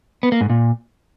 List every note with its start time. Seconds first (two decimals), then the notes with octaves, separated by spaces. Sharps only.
0.23 B3
0.32 A#3
0.41 G#2
0.50 A#2